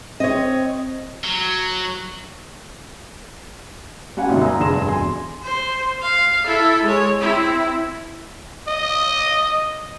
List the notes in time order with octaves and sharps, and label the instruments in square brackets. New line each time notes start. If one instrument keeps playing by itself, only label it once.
[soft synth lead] C4 [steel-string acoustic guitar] C#5 D#5
[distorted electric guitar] F#3
[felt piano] G3 C#4 F#4 F#5 G#5
G#1 D#2 C3 D#4
G#5 A#5 D#6 E6
F1 G2 G#4 C6 A#6 E7
E1 G#5 C6
[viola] C5
F5
E4 A4
G#3 C#5
C4 E4
[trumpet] D#5